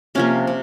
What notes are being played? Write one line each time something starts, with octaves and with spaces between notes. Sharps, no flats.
C3 F3 A#3 C#4
C3